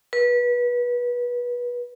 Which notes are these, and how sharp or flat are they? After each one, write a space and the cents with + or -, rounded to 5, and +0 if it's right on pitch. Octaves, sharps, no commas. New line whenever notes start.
B4 -25